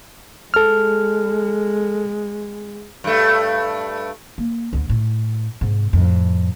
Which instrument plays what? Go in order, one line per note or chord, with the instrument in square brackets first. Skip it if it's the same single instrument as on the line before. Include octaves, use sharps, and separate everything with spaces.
[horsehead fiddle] G#3 [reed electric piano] A4 F6
[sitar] G2 A3
[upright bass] A#3
D2 D3
A2
G#2 C3
F2 A2